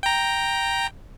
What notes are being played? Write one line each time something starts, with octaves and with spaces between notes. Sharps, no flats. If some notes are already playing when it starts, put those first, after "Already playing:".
G5 A#5